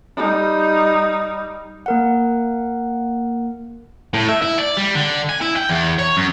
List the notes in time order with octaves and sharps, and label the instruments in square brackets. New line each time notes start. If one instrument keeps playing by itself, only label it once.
[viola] G3 D#4
[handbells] A#3 A#4 F#5
[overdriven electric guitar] A2
E5
E4
D5
G3
D3
G#5
E4
G5
E2
C#5
F#2